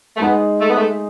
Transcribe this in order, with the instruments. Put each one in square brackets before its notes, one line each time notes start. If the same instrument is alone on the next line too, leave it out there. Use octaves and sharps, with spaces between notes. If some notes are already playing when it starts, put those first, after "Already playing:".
[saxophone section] A3
[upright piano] G#3 D#4 G#4 [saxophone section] B3
[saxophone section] A3
B3
A3